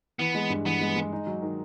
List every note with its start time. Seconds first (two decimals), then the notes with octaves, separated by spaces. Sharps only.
0.19 E3 B3
0.35 G#3
0.50 G2
0.66 E3 B3
0.81 G#3
0.96 G#3
1.12 D#4
1.27 F#3
1.42 D#3